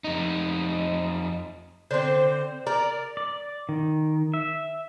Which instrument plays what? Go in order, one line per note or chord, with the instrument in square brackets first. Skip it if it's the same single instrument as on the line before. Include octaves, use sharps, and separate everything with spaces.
[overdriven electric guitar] F2 D#4
[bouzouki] D3 C4 [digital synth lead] C5
[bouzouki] A#4 [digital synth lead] D5
[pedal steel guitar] D5
D#3
E5